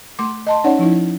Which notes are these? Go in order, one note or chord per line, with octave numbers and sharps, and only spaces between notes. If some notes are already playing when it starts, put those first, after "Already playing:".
A3 C6 D6
D#5 A5 C6
C#4 D#4 C#5 D5 F#5
F3 D#4 E4